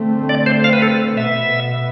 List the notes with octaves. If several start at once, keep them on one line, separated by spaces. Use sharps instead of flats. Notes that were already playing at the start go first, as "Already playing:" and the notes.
Already playing: D3 A3 C4
D5
C5
F5
B4
A4
B2 B3 E5